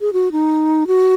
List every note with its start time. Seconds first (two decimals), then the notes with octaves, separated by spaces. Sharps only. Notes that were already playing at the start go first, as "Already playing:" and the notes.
0.01 G#4
0.13 F#4
0.32 D#4
0.87 F#4